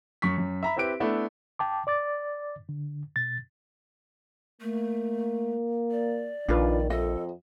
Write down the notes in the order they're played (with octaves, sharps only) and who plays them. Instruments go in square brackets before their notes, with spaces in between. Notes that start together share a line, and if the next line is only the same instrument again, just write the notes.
[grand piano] F#2 C#6 B6
F#2
E5 A#5 B5
C4 E4 G4 B4 D7
A3 B3 D4 E4
[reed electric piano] G5 A5 D6
D5 D6 A6
D3
B2 A6
[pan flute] A3 [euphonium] A#3
[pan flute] D5
[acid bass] A#1 [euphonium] D#3 [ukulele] D4 F4 B4
[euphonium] F2 [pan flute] A4 [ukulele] D#5 E5